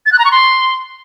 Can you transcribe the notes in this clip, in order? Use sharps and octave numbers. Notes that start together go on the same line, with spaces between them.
A6
F#6
A#5
C#6
C6